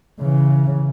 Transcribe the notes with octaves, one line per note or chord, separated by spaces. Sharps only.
C#3 E3